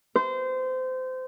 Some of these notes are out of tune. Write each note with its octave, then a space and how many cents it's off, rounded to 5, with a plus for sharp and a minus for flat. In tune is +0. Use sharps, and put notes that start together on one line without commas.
C5 -25